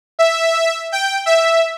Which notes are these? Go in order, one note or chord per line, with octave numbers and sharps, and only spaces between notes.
E5
G5
E5